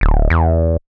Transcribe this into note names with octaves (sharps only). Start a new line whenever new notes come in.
D1
E2